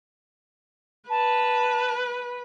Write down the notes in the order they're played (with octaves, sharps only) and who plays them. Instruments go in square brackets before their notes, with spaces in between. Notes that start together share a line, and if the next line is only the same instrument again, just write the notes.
[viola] B4 [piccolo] A5